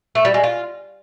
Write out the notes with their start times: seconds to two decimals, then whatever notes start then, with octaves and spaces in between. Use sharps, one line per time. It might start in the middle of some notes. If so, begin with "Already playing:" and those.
0.15 A3
0.25 G3
0.34 G#3
0.44 F4